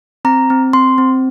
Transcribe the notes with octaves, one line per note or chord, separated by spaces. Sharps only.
C4 A#5
C4
C4 C6
C4